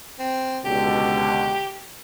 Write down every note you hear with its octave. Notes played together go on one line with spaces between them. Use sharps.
C4
C#2 B2 D3 G4